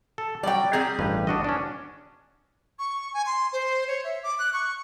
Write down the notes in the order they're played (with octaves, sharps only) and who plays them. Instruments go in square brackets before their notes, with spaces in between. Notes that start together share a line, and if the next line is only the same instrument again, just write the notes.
[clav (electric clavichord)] A4
[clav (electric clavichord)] F#3 G3 [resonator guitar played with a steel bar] D5 G5
[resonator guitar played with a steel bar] G3 C4 G#4 [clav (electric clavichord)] A#5
[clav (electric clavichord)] A1 G2 B4
D4 F#4 D#5
C#4 D4
[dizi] C#6
G#5
C6
C5
C#5
E5
D6
F#6
C#6